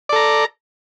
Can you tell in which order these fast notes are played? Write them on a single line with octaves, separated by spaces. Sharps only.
D5 A4 A#5